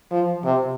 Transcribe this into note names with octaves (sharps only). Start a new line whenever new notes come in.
F3
C3